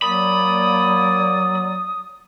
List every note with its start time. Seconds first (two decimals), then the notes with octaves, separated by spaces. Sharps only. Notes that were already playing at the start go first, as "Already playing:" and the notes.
0.02 F#3 A#3 D5 B5 D#6